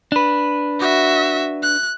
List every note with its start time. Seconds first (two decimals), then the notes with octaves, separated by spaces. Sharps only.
0.12 D4 B4
0.79 F#4 E5
1.63 F#6